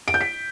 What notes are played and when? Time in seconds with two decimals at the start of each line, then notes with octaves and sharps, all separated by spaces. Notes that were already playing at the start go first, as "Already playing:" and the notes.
0.08 D7
0.14 G6
0.21 B6